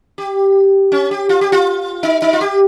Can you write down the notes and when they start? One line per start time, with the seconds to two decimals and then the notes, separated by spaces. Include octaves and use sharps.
0.18 G4
0.92 C#4
1.11 G4
1.29 F4
1.41 G4
1.52 F4
2.03 D#4
2.22 D#4
2.33 F4
2.41 G4